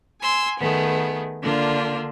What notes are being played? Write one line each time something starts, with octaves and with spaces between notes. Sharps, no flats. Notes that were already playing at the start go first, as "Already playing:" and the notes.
G#5 C6 E6
D#3 A3 B3 G#4
D3 A#3 D4 F4